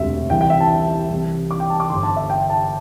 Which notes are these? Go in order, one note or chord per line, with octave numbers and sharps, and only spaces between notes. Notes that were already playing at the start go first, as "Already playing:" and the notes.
Already playing: E1 D2 C3 E5
C2 C3 E3 G5
G5
E5
A5
C2 C3 E3
D6
G5
A5
D6
G1 G2 D3 C6
A5
E5
G5
A5